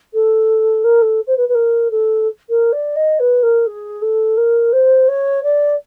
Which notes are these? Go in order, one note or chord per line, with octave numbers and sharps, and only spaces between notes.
A4
A#4
A4
C5
B4
B4
A#4
A4
A#4
D5
D#5
B4
A#4
G#4
A4
A#4
C5
C#5
D5